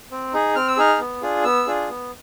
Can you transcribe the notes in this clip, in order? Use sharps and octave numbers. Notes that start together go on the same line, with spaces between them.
C4
D#4 G#4
C4 F6
E6
D#4 G#4 F6
B3
D4 F4 G#4
B3 E6
D4 F4 G#4
B3